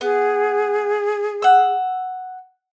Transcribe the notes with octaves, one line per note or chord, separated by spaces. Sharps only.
B3 G#4
F#5 E6